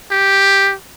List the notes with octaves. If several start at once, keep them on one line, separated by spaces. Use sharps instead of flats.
G4